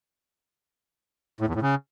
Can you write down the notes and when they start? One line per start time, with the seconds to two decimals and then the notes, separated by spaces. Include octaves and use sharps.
1.41 A2
1.48 E2
1.55 A2
1.62 C#3